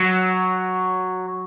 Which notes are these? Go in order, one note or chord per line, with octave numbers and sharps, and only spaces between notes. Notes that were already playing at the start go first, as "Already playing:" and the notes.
Already playing: F#3